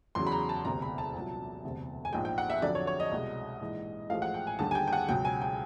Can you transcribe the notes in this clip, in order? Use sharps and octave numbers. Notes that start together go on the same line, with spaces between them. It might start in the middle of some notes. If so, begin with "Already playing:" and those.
E2 C#3 F#3 C6
B5
A#5
A5
E1 D2 C3 A#5
B5
A5
C2 A#2 F#3
E1 D2 C3
G#5
A#1 G#2 F3 G#3 G5
G5
F#5
E5
F2 D3 F#3 D5
C#5
C#5
D#5
C2 B2 G#3
A#1 G#2 E3 G#3
A1 A2 F3 G#3 F5
F#5
G5
G#5
D#2 D3 G3 A5
G#5
G5
G5
F#5
C#2 B2 F#3 G5
G#5
G5